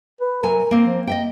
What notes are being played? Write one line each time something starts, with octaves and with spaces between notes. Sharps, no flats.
B4
C3 F#3 A#4 G#5
A#3 C4
F3
A#3 D#5 E5 G5